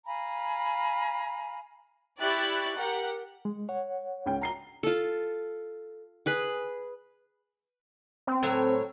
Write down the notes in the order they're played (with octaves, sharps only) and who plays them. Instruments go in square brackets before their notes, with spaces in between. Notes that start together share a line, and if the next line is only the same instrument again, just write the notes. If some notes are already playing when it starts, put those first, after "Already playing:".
[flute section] F5 G#5 A#5 B5
[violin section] E4 G4 D5 C#6 F#6 A6
G4 A#4 F#5
[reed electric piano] G#3
C#5 F#5
[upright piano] C#2 C#4 G5
A#5 C7 G7
[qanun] F4 A4
G#4 B4 B5
[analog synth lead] C4
[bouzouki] A2 F#3 C#5